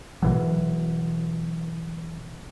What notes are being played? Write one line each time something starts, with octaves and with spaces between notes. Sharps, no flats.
B2 E3 F#3